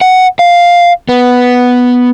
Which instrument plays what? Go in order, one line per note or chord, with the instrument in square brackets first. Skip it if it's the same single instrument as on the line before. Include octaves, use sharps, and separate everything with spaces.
[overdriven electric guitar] F#5
F5
B3